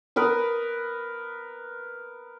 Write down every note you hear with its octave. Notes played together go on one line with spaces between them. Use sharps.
A#4 B4 D#6